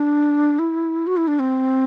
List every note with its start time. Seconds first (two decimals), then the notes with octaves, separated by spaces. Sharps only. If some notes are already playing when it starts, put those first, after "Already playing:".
Already playing: D4
0.59 E4
1.07 F#4
1.17 E4
1.28 D4
1.39 C4